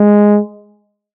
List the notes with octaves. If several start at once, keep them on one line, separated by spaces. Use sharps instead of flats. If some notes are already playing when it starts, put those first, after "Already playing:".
Already playing: G#3